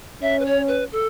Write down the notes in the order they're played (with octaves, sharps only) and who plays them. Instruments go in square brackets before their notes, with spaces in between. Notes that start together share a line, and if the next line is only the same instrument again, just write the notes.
[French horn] C#4 [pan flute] E5
[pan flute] B4
C#5
B4
A4